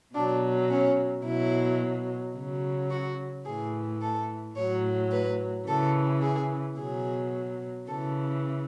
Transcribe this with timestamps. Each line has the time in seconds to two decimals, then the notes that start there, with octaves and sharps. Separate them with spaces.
0.14 B2 F#3 D4
0.69 C#4
1.24 B2 F#3 E4
2.34 C#3 F#3
2.90 F#4
3.45 A2 E3 G#4
4.01 A4
4.56 A2 F#3 C#5
5.11 B4
5.67 C#3 E3 A4
6.22 G#4
6.77 B2 F#3 G#4
7.87 C#3 E3 A4